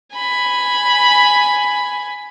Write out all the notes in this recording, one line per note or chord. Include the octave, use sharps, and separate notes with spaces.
G#5 B5